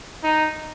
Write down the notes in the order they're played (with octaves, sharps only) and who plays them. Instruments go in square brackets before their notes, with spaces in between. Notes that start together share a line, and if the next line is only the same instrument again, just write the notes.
[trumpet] D#4